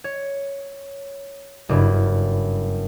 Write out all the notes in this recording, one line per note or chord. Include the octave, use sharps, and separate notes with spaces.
C#5
F#1 G2 E4